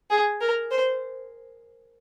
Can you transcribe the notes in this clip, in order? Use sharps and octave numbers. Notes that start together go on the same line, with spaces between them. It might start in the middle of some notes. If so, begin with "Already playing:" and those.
G#4
A#4
C5